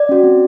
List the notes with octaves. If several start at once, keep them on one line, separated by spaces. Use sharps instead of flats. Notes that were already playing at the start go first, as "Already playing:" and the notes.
Already playing: D5
C#4 F#4
C4